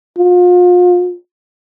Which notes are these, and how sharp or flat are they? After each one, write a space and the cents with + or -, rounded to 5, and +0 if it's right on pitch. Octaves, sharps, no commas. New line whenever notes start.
F4 +35